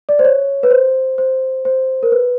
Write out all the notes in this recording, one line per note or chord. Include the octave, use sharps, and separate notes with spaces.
D5
C5
C#5
B4
C5
C5
C5
A#4
B4